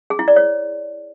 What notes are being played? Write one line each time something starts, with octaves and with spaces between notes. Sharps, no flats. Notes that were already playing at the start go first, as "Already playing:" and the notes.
G#4
E4
D5
C#5